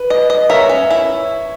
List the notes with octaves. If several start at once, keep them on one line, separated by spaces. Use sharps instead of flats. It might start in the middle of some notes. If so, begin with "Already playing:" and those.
Already playing: B4
D#5
D#5
A#4 C#5 E5
C#4
E4